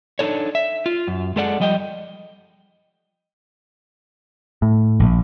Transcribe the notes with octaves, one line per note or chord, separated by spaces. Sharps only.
D4 D#4 A4 C#5
E5
F4
F#2
G#3 G#4 A4 D5 F#5
F3 G3 D#5 F#5 G5
A2
A#1